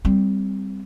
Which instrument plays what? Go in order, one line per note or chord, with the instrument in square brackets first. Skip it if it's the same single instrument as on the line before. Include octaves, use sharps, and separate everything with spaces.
[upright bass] G3 C4